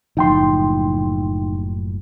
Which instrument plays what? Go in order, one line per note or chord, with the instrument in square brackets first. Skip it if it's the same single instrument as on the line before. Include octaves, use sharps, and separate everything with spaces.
[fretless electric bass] F#1 A2 F3 [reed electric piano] D#4 G5 C6